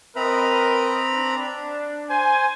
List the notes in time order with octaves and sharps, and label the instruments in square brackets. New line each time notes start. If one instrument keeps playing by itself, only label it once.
[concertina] C4 A#5 B5 [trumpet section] A#4 B4 D#5
[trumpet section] D4
[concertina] C5 [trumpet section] G#5